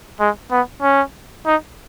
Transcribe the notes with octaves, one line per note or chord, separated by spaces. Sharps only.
G#3
B3
C#4
D#4